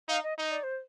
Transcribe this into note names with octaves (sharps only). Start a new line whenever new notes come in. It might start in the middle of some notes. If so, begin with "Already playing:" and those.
D#4 F5
D#5
D#4 D#5
D5
C5